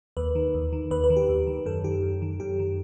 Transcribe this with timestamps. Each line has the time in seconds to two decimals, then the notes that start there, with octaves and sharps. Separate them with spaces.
0.17 D#2 B4
0.35 D#3
0.54 D#2
0.73 D#3
0.91 D#2 B4
1.04 B4
1.10 D#3
1.16 G4
1.29 D#2
1.47 D#3
1.66 F#2 A4
1.84 D#3 G4
2.03 F#2
2.22 D#3
2.40 F#2 G4
2.59 D#3